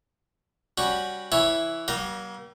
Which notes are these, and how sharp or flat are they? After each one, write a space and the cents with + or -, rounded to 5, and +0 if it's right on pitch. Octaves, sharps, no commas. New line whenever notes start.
G3 +0 C#4 +0 F#4 +0
E3 +0 E4 +0 C#5 +0
G3 -40 A#3 +40 A#5 -5